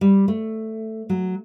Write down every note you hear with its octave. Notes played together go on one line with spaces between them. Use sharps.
G3
A3
F#3